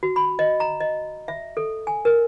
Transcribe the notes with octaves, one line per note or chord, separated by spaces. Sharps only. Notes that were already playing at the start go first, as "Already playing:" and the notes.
F#4
B5
D#5
A#5
D#5
E5
A4
G#5
A#4